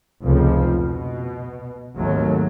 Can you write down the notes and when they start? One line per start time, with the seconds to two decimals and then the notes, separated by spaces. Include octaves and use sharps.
0.22 F1 C#2 F3
0.77 B2
1.96 G#1 D#2 F#3 A3